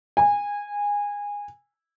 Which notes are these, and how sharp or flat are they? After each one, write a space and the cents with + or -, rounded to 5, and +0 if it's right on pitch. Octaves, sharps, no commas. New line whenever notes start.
G#5 -20